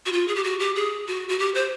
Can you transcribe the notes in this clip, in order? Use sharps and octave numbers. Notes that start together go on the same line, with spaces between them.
F#4
F4
G#4
G4
F#4
G4
G#4
F#4
F#4
G4
C5